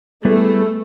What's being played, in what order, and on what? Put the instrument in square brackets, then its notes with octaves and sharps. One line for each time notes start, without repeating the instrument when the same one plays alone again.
[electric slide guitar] G3 B3 E4 G#4 B4 [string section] A3